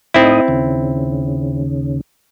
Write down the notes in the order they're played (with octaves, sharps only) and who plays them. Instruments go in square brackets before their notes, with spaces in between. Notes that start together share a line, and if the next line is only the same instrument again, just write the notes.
[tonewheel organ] A2 D#4 D#5 [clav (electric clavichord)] C4 E4
[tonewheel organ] D#2 C#3